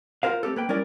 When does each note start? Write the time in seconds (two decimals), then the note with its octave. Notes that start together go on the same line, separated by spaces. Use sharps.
0.23 F4 G#4 A#4 C5 F5
0.43 A3 C4 G4 A4
0.56 A#3 B4 G5
0.69 G3 C#4 E4 A#4 D5